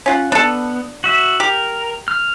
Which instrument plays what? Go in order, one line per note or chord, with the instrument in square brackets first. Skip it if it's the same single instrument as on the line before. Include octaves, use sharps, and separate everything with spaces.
[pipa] C#4 F4 F#5
[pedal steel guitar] B3 [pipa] D4 A4
[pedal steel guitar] F#4 E5
[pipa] G4 [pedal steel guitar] A#4
[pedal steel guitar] F6